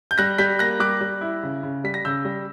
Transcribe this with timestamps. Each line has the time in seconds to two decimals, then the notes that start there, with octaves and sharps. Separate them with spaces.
0.11 G6
0.18 G3 F#6 A#6
0.38 G3 G6 B6
0.59 A#3 F#6 A#6
0.80 G3 D6 F#6
1.01 G3
1.21 E4
1.43 C#3
1.63 C#3
1.84 G3 B6
1.94 A#6
2.05 C#3 E6 G6
2.25 G3